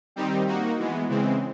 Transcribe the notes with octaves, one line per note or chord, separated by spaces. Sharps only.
D#3 G3 C4 D#4 G4
A#3 D#4 F#4
E3 G#3 B3
C#3 E3 G#3 C4